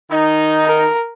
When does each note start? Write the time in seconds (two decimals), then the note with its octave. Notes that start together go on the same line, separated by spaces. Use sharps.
0.11 D#3 D#4
0.66 A#4